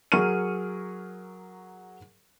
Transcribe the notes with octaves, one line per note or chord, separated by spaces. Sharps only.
F#3 G#4 A#4 C#6 F6 D#7